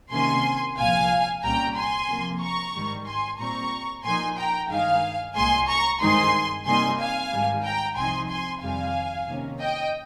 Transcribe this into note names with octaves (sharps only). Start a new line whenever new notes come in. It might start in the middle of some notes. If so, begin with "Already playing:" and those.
C3 D#3 A#3 C#4 G#5 C6
C2 A#2 F3 F5 G#5
C2 A#2 G3 C#4 G5 A#5
G#5 C6
C3 F3 A#3
A#5 C#6
G#2 D#3 G3
G#5 C6
A#2 G3 C4 A#5 C#6
A#2 F3 A#3 D#4 G#5 C6
G5 A#5
G2 D#3 G#3 D#4 F5 G#5
C2 A#2 G#3 G#5 C6
A#5 C#6
G2 D#3 G#3 C4 D#4 G#5 C6
C3 G3 A#3 D#4 G#5 C6
F5 G#5
G#2 D#3 G3
G5 A#5
C2 C3 F3 C4 D#4 G#5 C6
G#5 C6
F2 C3 D#3 G3 F5 G#5
C3 D#3 A#3 C#4
D#5 G5